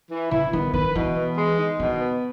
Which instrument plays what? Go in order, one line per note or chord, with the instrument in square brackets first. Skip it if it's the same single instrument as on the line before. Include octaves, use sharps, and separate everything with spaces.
[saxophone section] E3
[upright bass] C#3 [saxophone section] E4
[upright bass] D#3 [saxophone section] B3
[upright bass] D#3 [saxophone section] B4
[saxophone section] B2 [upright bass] E3
[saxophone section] B3
G#3
D#4
[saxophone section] B2 [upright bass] D#3
[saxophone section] B3